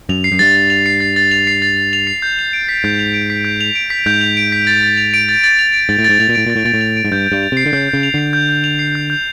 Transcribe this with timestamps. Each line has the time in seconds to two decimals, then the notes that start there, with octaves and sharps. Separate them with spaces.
0.09 F#2 F7
0.24 C7
0.32 F#2
0.39 G2 A6
0.56 A6
0.70 F7
0.86 C7
1.01 A6
1.16 A6
1.31 F7
1.47 C7
1.62 A6
1.77 A6
1.93 F7
2.07 C7
2.22 G6
2.39 F7
2.53 D7
2.69 B6
2.84 G#2 G6
2.99 F7
3.14 D7
3.30 B6
3.45 G6
3.61 F7
3.75 D7
3.90 B6
4.06 G#2 G6
4.21 F7
4.37 D7
4.52 B6
4.67 A6
4.83 A6
4.97 F7
5.14 D7
5.29 A6
5.44 A6
5.59 F7
5.74 D7
5.89 G#2 A6
5.99 A2
6.04 G#2 A6
6.20 A2 F7
6.29 A#2
6.35 A2 D7
6.46 A#2 A6
6.56 A2
6.65 A#2 A6
6.74 A2
6.81 F7
6.97 D7
7.05 G#2
7.12 G2 G6
7.26 G6
7.32 G2
7.43 F7
7.52 C3 C7
7.66 D3
7.73 C#3 G6
7.88 C#3 G6
8.03 F7
8.14 D3 C7
8.33 G6
8.49 G6
8.64 F7
8.79 C7
8.95 G6
9.10 G6